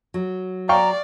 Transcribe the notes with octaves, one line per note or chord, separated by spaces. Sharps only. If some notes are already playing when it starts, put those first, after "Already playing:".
F#3
D5 F5 G5 A#5 C#6